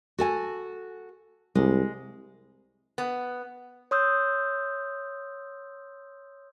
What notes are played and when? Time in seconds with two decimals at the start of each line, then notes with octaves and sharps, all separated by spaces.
0.18 F#4 A4 G#5
1.55 C2 G#3
2.98 B3
3.91 C#5 C6 D#6 E6 G6